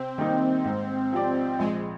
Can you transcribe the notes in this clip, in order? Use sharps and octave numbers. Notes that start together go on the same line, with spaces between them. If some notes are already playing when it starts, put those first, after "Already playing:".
Already playing: C3 C4
D#3 G3 A#3 D#4
G#2
F3 C4 G4 D5
A#1 G#3